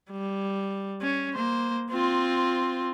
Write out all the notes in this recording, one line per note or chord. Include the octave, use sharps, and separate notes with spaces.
G3
C#4
A#3 C5
C4 F4